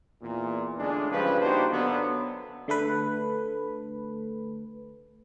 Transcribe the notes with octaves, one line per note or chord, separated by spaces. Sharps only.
E2 A#2
A2 D3 G#3 C#4 D4
G2 C#3 F3 B4
A#3 D4 D#4 F#4 G4 C5
F#2 D3 F#3 B3
D3 A3 A4 B4